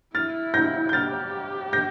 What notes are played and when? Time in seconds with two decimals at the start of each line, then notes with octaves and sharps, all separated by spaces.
0.15 E4 F6 A6
0.54 G6 A#6
0.89 G6
0.93 G4 F6 A6
1.73 G6 A#6